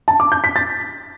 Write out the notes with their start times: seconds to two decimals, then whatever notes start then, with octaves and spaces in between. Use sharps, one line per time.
0.08 A5
0.20 D6
0.32 G6
0.44 B6
0.56 A6